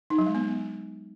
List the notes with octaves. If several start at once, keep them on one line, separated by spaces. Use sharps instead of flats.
D#4
F#3
G#3
B3